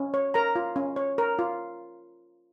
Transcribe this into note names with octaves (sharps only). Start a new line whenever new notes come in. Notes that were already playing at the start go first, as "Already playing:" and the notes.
Already playing: C#4
C#5
A#4 A#5
F4
C#4
C#5
A#4
F4